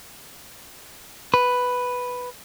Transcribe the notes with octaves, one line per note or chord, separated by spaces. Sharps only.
B4